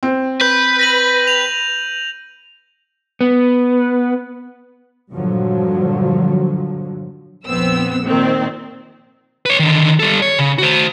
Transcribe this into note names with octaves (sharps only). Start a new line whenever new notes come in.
C4
B4 G6
A#6 D#7 F#7
F7
B3
G2 A#2 D3 F3 F#3
A#1 F2 B3 C4 E6
A#2 D#3 C4
B4 C#5
D3 D#3
G3 A4
C#5
C#3
F#4 C5